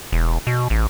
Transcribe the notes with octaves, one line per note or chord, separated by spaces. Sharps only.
E1
B2
A1